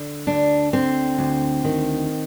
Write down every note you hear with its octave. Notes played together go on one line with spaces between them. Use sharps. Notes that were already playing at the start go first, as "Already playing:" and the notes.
Already playing: D3
D2 D4
D3 C4
D2
D#3